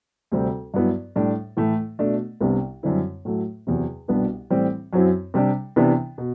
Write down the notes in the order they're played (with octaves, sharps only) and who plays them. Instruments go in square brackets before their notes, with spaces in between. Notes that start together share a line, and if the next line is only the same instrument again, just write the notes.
[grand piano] D2 C3 G3 C4
G2 F#3 B3 E4
A2 G3 D4
A2 E3 A3
B2 A3 D4
C2 C3 G3 B3 D4
F#2 D3 G3 C4 E4
A2 F#3 A3
E2 C3 F#3
C2 B2 G3 B3 D4
A2 E3 G3 C4
F#2 F#3 C4 E4
C3 G3 D4
C3 E3 B3 D4
B2